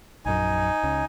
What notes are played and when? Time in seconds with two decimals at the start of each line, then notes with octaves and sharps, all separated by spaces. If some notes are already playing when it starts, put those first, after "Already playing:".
0.26 A#1 F#2 D#4 G#5
0.83 C#2 C#3